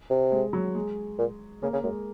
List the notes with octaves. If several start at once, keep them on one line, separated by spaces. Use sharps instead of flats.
C3
G#3
F#3
G#3
A#2
C#3 A#3
C#3
F#2 G#3